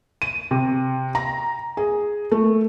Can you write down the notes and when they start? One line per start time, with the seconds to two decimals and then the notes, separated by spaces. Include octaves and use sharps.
0.22 D#7
0.51 C3
1.15 A#5
1.77 G#4
2.32 A3